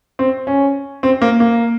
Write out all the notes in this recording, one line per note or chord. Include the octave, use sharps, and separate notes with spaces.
C4
C#4
C4
A#3
A#3